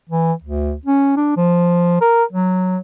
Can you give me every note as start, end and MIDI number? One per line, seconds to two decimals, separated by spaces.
0.10 0.33 52
0.44 0.74 38
0.86 1.13 61
1.17 1.37 62
1.37 2.01 53
2.01 2.24 70
2.33 2.78 54